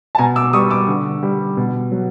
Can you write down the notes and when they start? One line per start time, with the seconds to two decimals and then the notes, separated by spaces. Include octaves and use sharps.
0.15 A5
0.18 B2 G#5 A#5
0.36 D6 E6
0.53 G3 C#6 D#6
0.70 D6 E6
0.88 D3
1.23 G3
1.57 B2
1.92 F#3